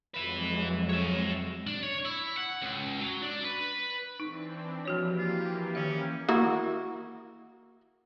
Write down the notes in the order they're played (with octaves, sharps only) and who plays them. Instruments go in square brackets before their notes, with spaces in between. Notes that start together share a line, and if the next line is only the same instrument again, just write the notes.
[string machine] F2 F#3 G#3 [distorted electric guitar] B4 E5
[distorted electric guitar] C#5 E5
D4
C#5
E4
F#5
C#2
F#3
D4
B4
[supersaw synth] E3 C4 D4 [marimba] D#4
[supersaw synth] E3 A#3 G4 [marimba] F3 F#4 C#5
[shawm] F4
[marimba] D#3 E5 [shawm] C#4
[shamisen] A#3 E4 F#4